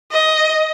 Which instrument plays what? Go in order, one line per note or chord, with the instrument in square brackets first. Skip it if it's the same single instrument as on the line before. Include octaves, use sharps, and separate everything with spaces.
[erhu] D#5